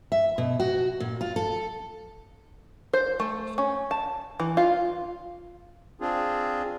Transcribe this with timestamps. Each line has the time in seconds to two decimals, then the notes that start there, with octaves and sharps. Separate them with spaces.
0.12 E5
0.38 B2
0.60 F#4
1.00 A#2
1.21 F4
1.36 A4
2.93 C5
3.20 A3
3.58 C#4
3.91 A5
4.40 E3
4.57 F4
6.01 C4 D4 F4 G#4